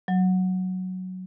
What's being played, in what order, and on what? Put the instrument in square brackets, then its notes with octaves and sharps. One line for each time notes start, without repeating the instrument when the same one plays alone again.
[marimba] F#3